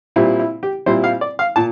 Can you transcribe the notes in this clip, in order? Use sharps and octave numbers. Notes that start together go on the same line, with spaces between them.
A#2 G3 C4 E4
E4
G4
A#2 G3 C4 E4 C5
F5
D5
F5
A#2 A5